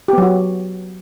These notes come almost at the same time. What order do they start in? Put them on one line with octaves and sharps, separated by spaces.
G4 B3 F#3 F#4